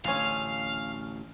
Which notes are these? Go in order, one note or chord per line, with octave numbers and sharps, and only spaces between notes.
A1 D3 G#3 C#4 F5